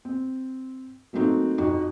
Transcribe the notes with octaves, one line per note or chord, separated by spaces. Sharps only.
C4
F#3 A3 A#3 C4 D#4 F#4
F2 D#4 F#4